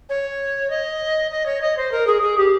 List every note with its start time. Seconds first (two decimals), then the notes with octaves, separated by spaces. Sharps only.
0.09 C#5
0.70 D#5
1.31 D#5
1.46 C#5
1.61 D#5
1.77 C5
1.92 A#4
2.07 G#4
2.22 G#4
2.38 G4